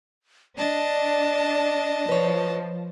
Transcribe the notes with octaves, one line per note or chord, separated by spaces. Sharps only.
D4 D5 D#5 A5
F3 B4 C#5